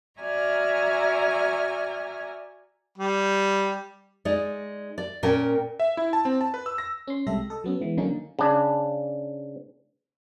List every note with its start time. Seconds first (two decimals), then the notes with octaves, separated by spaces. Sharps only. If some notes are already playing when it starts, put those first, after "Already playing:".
0.19 F#4 D5 E5 G#5 A#5 F6
2.98 G3
4.25 G#3 D#4 D5
4.98 D5
5.23 A#2 C#4 A#4 G5
5.80 E5
5.97 E4
6.13 A5
6.25 C4
6.41 A5
6.54 B4
6.66 E6
6.78 A#6
7.08 C#4 C6
7.27 C2 G#3 G4 A4 E5 A#6
7.50 A4 D#5
7.64 F#3 B3 C#4
7.80 E3 G#3 B3
7.97 D3 F#3 A#3 C#4 D#4
8.39 C#3 D4